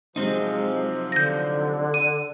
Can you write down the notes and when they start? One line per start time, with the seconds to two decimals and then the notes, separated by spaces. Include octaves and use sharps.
0.16 C3 F3 F#3 G#3 C4 D#4
1.12 D3 G6 A#6
1.94 D#7